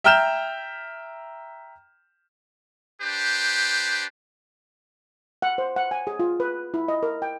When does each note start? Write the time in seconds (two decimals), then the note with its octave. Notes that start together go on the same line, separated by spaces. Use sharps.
0.04 E5 G5 A#5 F6 G6 E7
3.01 D4 G4 B4 C5
5.42 F#5
5.58 C5
5.76 F#5
5.91 G#5
6.07 G#4
6.19 F4
6.40 B4
6.74 E4
6.88 D#5
7.03 A#4
7.22 G5